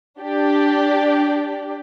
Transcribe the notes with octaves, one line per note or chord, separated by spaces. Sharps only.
D4 G4 D5